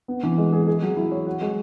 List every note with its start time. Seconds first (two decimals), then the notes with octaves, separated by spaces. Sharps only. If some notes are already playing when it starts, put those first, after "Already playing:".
0.08 B3
0.23 E3
0.38 G#3
0.53 G#4
0.67 G#4
0.82 F#3
0.97 E4
1.12 C#5
1.26 F#4
1.41 G#3